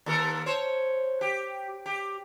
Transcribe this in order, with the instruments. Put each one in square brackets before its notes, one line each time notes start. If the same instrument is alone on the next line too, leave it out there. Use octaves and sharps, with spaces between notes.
[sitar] D#2 A4 A#4
C5 C#5
G4
G4